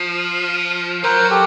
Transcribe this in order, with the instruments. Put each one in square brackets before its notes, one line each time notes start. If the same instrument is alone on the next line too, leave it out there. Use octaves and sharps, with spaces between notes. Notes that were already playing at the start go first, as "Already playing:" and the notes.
Already playing: [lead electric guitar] F3
[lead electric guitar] F#3 [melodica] A#4 C5
[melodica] G4 A4